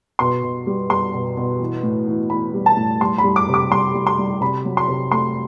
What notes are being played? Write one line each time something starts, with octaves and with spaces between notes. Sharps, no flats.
B2 C6
B2
G3
G3 C6
B2
B2
E3
A2
E3
E3 B5
G3
A5
A2
G3 C6
B5
G3
D6
C3
D6
G3 C6
G3
C6
G3
C3 B5
F#3
C6
C3
A3 C6